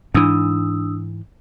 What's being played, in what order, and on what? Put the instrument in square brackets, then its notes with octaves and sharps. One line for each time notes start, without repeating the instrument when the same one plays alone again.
[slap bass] G#2 E3 [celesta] D4 D#6 E6